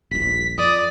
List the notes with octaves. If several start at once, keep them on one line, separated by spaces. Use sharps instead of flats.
D#1 A#1 B6
F2 D5 D#6